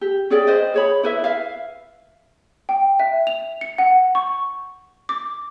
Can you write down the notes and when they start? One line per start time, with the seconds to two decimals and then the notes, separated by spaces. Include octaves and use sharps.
0.01 G4
0.30 C#4 G#4 D5 G5
0.47 B4 C5 D#5
0.74 G#4 C#5 B5
1.03 E4 B4 E5
1.24 B4 E5 F5
2.69 G5
3.00 E5
3.27 F7
3.61 C#7
3.78 F#5
4.15 C#6
5.09 D6